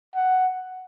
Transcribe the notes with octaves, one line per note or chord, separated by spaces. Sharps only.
F#5